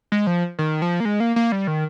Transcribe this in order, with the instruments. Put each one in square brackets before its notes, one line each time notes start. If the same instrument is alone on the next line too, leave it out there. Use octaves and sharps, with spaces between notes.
[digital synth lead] G#3
F3
D#3
F3
A#3
G#3
A#3
A#3
G3
D#3